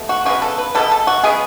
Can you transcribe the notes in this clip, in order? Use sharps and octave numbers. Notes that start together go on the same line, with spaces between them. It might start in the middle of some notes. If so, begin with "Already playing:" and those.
Already playing: B2 A3
F#4
C#3 G#3 B3 F#4
A4
B4
B2 G#3 B3 A4
A4
F#4
C#3 G#3 B3 G#4